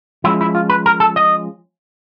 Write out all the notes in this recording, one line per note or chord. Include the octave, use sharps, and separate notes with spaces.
F3 G#3 C#4 E4
E4
F4
B4
A#4
A4
D#5